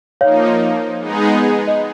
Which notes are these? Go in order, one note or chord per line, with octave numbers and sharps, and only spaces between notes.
F3 A#3 D#4 C#5 F5
G#3 B3 D#4 G#4
D#5